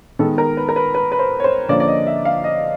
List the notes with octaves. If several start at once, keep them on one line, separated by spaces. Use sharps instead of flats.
D#3 G#3 B3 A4
A#4
B4
A#4
B4
B4
B4
C5
C#5
C5
D3 F3 A#3 C#4 D5
D5
D#5
E5
F5
D#5